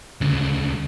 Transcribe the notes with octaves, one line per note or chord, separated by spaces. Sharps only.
D2 C#3